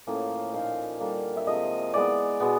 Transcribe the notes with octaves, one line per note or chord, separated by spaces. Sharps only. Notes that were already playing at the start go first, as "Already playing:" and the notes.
A2 F3 A#3 C#4
A#2 F3 A#3 D#4 F5
D3 G3 A#3 D4
E5
C3 F3 G#3 D#5
E3 G#3 B3 D5
B2 G#3 B3